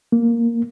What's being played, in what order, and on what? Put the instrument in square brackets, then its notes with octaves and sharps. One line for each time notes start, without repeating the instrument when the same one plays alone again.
[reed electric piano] A#3